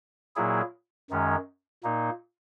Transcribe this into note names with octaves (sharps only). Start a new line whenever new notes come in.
A#2 F#3 A#3 E4 G#4
F#2 D#3 G#3 C#4
A#2 A#3 D#4